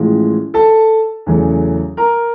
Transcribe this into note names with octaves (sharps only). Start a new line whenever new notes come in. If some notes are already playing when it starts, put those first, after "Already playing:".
Already playing: A1 A2 F3 G#3
A4 A5
E2 C#3 F#3 A3
A#4 A#5